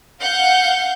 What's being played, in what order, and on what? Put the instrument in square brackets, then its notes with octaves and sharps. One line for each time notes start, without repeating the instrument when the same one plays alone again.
[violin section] F5 F#5 G6